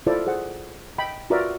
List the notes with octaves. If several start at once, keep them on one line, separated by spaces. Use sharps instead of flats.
E4 F4 A4 C5 D5
G#4 C5 F#5
D#5 G5 B5
F4 F#4 A#4 B4 D5 E5